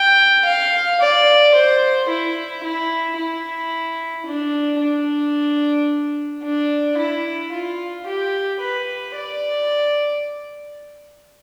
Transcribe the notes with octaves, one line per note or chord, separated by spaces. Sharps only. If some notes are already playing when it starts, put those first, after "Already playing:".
Already playing: G5
F5
D5
C5
E4
E4
E4
D4
D4
D4
E4
F4
G4
B4
D5